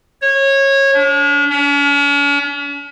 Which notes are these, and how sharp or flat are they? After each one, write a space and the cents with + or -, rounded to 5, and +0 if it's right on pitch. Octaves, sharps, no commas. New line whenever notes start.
C#5 -20
D4 -40
C#4 +45